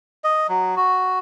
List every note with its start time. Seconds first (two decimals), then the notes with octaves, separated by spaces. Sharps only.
0.24 D#5
0.49 F#3
0.76 F#4